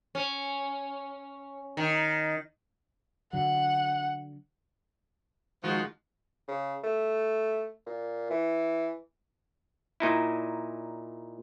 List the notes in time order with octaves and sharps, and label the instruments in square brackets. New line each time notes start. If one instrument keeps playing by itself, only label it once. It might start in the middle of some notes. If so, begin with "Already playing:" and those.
[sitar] C#4
D#3
[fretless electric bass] D3 F#3 [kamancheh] F#5
[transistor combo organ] D#3 F#4 [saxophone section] F3 [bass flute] G#3
[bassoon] C#3
A3
A#2
E3
[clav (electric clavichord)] A#2 D#4 E4